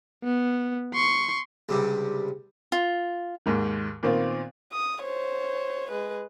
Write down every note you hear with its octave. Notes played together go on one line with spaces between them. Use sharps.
B3
C6 C#6
C#2 G2 C3
F4
D#2 G#2 D#3
A#2 D#3 B3 C4 F4
D#6
C5 C#5
G#3 B4